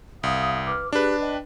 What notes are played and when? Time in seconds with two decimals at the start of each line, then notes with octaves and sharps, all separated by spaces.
0.23 C2 F5 D#6
0.66 B4 D6 F6
0.93 D4 G4 G#4 B4
1.20 D#5 G5